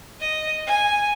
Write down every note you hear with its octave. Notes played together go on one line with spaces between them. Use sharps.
D#5
G#5